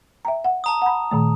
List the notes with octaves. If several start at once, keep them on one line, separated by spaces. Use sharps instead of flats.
E5 G5 A#5
F#5
A5 A#5 D#6
F#5 B5
A#2 D#3 A3